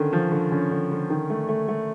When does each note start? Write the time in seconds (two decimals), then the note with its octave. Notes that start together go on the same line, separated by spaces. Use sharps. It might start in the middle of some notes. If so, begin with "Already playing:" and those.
Already playing: D3 D#3 C#4
0.13 F3
0.32 D3
0.52 D3 C#4
0.71 D3
0.91 D3
1.10 D#3
1.30 A3
1.49 A3
1.69 A3